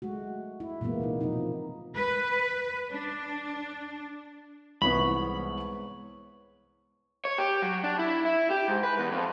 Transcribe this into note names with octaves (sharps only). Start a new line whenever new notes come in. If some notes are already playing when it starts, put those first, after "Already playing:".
G#3 A3 F#4
E4
A#2 E3 G#3 A#3 B3
C3 E3 D#4
B2 F3 A#3 D#4
B4
D4
C2 G#2 E3 B3 C#5 B5 C#6
C#5
G4
F#3
D4
E4
E4
G4
G#2
B4
E2
F2